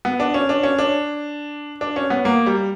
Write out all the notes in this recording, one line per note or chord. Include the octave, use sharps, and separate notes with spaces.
B3
D4
C#4
D4
C#4
D4
D4
C#4
B3
A#3
G3